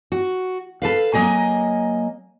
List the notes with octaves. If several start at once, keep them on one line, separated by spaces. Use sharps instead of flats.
F#4
A4 B4 F5
F#3 A#3 D#5 G#5